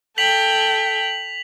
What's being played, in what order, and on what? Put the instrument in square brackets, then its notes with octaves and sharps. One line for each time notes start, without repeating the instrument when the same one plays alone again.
[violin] A4 G5 [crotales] B6 F7 F#7